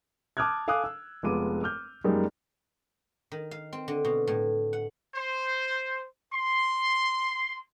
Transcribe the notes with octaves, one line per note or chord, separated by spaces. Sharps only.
A5 D6 D#6 F6 F#6 G#6
A4 F5 G#5 D6 D#6 F#6
E6
F1 G#3 B3 F4 D6 D#7
D6 F6 G6
F#2 G3 G#3 A#3 D#4
D#3
F5
C4
D3
B2
A2
F#5
C5
C6